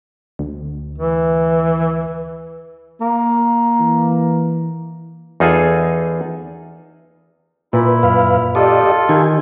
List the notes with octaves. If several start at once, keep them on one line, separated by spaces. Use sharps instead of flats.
D2
E3
A#3
E3
E2 D#4 F4 G#4 A4 G#5
A#2 E4 B4
F#2 B4 F5
F4 G4 A4 D5 D#5
D#3 G4 G#5